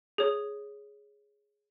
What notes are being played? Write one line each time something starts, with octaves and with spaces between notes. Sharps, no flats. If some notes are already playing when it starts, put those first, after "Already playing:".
G#4 C#5